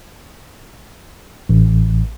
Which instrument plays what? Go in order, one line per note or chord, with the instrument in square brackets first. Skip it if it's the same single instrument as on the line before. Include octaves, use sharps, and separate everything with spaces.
[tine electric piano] A1